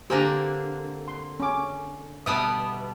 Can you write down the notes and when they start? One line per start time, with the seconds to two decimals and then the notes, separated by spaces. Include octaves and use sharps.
0.10 D3 A#3 C4 G4 G#5 A#5
1.08 C6
1.40 C#4 D6
2.26 B2 G3 B3 E5 A5 D#6